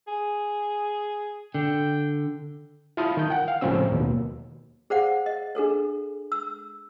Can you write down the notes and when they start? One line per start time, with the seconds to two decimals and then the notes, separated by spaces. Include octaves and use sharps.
0.07 G#4
1.55 D3 G5
2.97 E4 F4 F5 A5 D#6
3.17 D#3 G6
3.30 F#5 G5
3.48 F5
3.61 C#2 A2 F3 C4 C#4 E6
3.92 D#2 B2
4.90 G#4 C5 D5 F5 F#5
5.26 D#5
5.55 D4 G#4 A4 C#5
6.32 E6